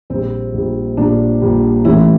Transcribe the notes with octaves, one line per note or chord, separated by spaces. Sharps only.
A#1 A#2 G3 C4
A#1 A#2 G3
A#1 A#2 G3 D4
A#1 A#2 G3
A1 A2 E3 G3 E4